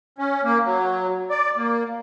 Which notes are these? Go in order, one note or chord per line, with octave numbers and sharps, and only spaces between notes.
C#4
A#3
F#3
D5
A#3